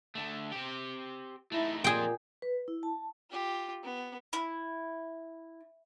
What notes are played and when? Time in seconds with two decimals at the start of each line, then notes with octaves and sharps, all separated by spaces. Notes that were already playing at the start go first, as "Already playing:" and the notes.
0.15 D3 A3
0.52 C4 G4
1.52 A3 D#4 E4
1.84 A#2 F3 C4 G#4 G5
2.42 B4
2.68 E4
2.83 A5
3.30 F4 G4
3.83 B3
4.33 E4